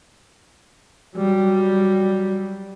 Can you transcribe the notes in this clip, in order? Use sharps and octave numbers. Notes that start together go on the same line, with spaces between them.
F#3 G3